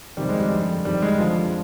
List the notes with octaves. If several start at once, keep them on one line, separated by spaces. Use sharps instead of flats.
F2 C3 D#3 G3
G#3
G3
F2 D3
F2 D#3 G3
G#3
F2 D3 F3